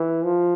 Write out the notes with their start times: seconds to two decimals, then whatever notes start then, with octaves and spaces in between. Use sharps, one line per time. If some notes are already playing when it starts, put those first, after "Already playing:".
Already playing: E3
0.24 F3